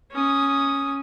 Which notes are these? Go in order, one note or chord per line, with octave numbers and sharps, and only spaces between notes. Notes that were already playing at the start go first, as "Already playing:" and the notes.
C#4 D#6